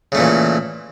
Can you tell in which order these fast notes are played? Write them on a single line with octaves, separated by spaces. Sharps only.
C#3 A3 A#2 E3